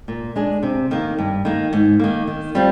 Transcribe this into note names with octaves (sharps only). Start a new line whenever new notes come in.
A#2
G#3 D4 G#4
C3
D#3 A#3
G2
D#3 A#3
G#2
D#3 A#3
D#3
G3 C4 F4